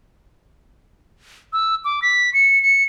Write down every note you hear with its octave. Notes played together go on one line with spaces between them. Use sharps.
E6
D6
B6
C#7
C#7